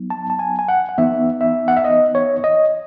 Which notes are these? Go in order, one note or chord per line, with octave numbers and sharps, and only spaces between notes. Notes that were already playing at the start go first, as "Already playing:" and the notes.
Already playing: F#3 B3 D#4
A5
A5
G#5
G#5
F#5
F#5
E3 B3 D#4 E5
E5
F#5
E5
D#5
C#5
D#5